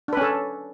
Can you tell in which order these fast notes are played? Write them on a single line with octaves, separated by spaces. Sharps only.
D4 B4 C#4 A4